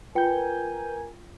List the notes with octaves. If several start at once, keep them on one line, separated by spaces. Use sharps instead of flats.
F4 A#4 B4 G5 G#5 G6